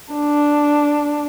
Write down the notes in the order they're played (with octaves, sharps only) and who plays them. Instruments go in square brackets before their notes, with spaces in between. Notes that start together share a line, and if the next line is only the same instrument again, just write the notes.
[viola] D4